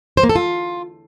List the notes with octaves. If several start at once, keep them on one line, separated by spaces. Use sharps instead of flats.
C5
A#3
A4
F4